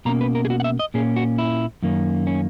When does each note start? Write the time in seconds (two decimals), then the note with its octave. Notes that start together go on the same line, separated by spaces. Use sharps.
0.05 B2 A#3 C#4 A#5
0.21 B4
0.35 A#4
0.45 G#4
0.50 F#4
0.60 F#5
0.64 E5
0.79 D#5
0.94 A#2 A#3 C#4 G#4
1.16 F#4
1.38 E4
1.83 F#2 D#3 A#3 C#4
2.27 C#4